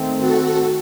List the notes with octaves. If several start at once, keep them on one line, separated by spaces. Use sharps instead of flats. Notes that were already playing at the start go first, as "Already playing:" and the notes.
Already playing: D#3 A3 C4
F#4 A4